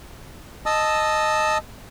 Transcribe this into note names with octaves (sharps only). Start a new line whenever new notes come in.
D#5 A5 D#6 E6